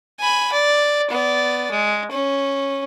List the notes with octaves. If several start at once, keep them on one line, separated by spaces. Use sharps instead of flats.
G#5 B5
D5
B3 D5
G#3
C#4